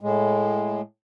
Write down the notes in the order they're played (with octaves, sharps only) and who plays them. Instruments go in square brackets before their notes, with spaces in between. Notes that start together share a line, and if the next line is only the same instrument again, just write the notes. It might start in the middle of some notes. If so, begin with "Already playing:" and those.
[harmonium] A2 G#3